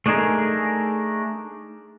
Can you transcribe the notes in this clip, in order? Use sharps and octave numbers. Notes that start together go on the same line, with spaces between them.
A3 D4 D#4 G#4 A#4